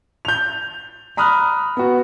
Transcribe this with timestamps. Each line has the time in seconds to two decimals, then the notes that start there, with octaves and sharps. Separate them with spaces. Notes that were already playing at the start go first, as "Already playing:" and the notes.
0.25 G6 F7
1.17 A#5 B5 D#6 F6 F#6
1.77 B3 F#4